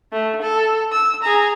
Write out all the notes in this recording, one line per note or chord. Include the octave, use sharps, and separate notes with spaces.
A3
A4
E6
G#4 A#5